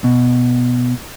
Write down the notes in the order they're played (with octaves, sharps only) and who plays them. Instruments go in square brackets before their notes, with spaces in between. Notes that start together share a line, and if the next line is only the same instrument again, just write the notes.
[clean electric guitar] B2